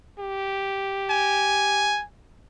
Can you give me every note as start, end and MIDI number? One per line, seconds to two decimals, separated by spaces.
0.19 2.00 67
1.10 2.04 80